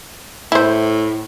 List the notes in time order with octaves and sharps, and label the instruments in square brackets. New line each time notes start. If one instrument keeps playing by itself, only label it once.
[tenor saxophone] A2 [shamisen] E4 C5